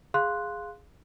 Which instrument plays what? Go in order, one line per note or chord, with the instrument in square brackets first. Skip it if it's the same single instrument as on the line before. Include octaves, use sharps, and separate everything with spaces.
[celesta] G#4 F5 C6 F#6